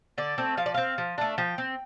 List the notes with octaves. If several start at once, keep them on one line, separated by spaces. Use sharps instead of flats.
D3 D5
A3 C4
F3 F5
D5
C4 F5
F3
A3 D4
F3 G5
C4